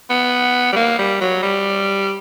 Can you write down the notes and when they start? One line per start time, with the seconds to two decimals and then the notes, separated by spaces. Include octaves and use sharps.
0.10 B3
0.72 G3
0.76 A#3
0.99 G3
1.21 F#3
1.43 G3